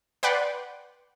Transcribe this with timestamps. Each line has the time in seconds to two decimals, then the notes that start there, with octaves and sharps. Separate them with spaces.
0.23 B4 D5 F#5 G5 C6